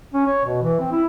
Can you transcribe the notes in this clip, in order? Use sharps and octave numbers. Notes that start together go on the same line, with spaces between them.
C#4
C#5
B2
E3
C4
E4